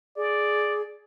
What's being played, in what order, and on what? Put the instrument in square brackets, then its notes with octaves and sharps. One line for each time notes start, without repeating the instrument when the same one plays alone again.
[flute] G#4 [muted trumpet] D5